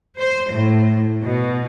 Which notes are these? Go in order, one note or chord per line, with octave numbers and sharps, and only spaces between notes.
C5
A2
B2